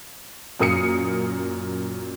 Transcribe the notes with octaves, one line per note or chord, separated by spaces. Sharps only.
F#2 A#2 A#4 D#6 C7 C#7